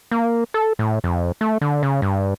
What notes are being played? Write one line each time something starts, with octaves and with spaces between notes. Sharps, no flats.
A#3
A4
A2
F2
A3
D3
C#3
G2